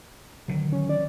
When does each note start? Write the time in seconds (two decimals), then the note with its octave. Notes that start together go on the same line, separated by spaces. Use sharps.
0.48 D3 D#3 F#3
0.72 C#4
0.89 D5